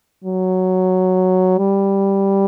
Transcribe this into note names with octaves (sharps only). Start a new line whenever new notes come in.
F#3
G3